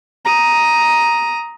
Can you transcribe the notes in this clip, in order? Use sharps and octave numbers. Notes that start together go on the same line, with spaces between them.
A#5 D#6